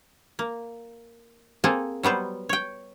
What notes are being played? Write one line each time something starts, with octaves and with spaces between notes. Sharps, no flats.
A#3
A#3 C4 G#4 A4
F#3 G3 B3 C5
C#5 G5